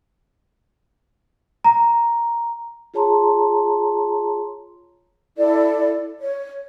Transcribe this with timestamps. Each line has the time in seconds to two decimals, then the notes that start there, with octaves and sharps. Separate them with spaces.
1.64 A#5
2.94 F4 G#4 C#5 A5 A#5 C6
5.37 E4 A4 D5
6.21 C#5